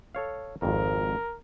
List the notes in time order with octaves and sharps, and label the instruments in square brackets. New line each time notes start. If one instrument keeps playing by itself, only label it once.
[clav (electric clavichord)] A4 C#5 F5
[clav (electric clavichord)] G#1 F2 [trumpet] A#4